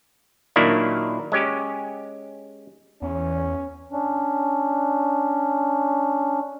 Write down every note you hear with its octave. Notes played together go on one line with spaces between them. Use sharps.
A#2 D#3 F#3 A#3 D4 E4
G#3 C#4 G4
E2 C#4
C#4 D4